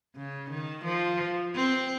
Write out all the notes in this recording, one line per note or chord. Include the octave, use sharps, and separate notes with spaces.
C#3
D#3
F3
C4